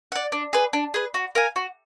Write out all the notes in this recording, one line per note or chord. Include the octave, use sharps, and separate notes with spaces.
D5 F#5
D4
G#4 B4
D4
G#4 B4
F#4
A#4 F5 G#5
F#4